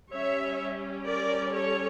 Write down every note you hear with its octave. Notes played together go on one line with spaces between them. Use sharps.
G3 C#4 C#5 E5
A#4 D5
A4 C#5